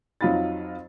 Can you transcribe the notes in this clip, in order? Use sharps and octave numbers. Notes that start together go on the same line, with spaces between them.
F2 F#3 D#4 F4 B5 A6